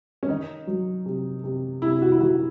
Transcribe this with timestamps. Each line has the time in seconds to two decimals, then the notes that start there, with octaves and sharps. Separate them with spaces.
0.23 C#4
0.29 D#3 D#4
0.67 F#3
1.06 C3
1.44 C3
1.82 C3 E4
2.02 F#4
2.12 E4
2.20 D#3 F#4